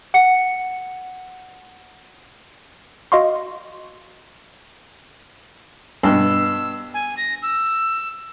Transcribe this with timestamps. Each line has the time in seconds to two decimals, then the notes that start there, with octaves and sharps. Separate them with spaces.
0.14 F#5 C#7
3.12 F#4 D#5 F5 C6 C#6
6.03 G2 B2 E6
6.94 G#5
7.17 A#6
7.43 E6